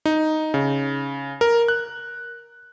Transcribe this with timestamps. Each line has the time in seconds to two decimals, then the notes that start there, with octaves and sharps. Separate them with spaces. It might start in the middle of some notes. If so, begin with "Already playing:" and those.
0.05 D#4
0.54 C#3
1.41 A#4
1.68 F#6